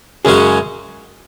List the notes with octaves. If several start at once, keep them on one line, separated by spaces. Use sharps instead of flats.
F#2 C#3 G#3 C#4 F#4 G#4